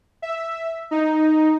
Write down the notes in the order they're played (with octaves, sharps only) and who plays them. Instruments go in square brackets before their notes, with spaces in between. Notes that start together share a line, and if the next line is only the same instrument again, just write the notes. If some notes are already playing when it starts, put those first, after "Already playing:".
[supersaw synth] E5
D#4